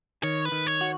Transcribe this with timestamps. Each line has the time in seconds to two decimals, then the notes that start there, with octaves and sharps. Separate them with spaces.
0.23 D#3 C#5
0.45 B4
0.52 D#3
0.67 C#5
0.81 F#4